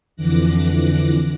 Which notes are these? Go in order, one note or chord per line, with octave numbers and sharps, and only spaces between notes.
F2 D3 E3 D6 F#6 A#6